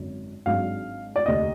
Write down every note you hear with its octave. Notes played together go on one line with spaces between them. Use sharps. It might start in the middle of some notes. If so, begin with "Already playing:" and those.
Already playing: G#1 F#2 D3
G#1 G#2 F#3 D4 F5
D5
F1 D#2 D3 D#5